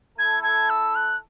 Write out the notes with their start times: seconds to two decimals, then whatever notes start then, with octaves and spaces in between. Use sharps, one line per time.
0.18 A3 E4 A4 G#6
0.43 G#6
0.70 E6
0.95 F#6